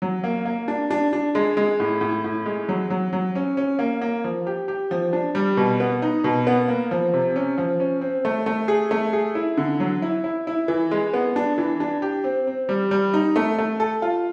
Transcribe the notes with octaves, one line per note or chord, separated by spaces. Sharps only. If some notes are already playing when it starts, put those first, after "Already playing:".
F#3
A#3
A#3
D4
D4
D4
G#3
G#3
A2
A2
A2
G#3
F#3
F#3
F#3
C#4
C#4
A#3
A#3
F3
G4
G4
F3
D4
G3
B2
B3
D#4
B2
B3
A#3
F3
C3
C#4
F3
C#4
C4
A3
A3
G#4
A3
G#4
E4
D3
F#3
E4
E4
E4
E3
G#3
B3
D4
E3
D4
G4
C4
C4
G3
G3
D#4
A3
A3
A4
F4